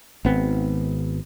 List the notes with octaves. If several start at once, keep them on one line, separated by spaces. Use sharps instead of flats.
G#1 B3 C4